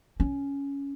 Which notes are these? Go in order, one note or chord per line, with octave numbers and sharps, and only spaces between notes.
C#4